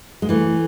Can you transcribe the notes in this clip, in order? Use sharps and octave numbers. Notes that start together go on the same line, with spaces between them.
G#3
E3 A3